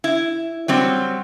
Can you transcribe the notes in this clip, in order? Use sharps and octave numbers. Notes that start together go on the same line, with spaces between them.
E4
F#3 G3 C4